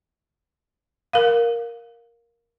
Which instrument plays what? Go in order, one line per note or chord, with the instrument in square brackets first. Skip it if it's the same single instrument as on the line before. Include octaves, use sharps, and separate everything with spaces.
[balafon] A#4 F5